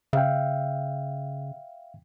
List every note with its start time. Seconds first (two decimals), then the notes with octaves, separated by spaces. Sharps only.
0.13 C#3 E5 F5 G5